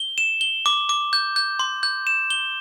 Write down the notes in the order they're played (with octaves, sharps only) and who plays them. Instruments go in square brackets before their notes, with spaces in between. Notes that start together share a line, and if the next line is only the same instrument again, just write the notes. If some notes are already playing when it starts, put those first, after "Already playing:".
Already playing: [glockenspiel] G7
E7
G7
D6
D6
G6
G6
C6
G6
E7
G7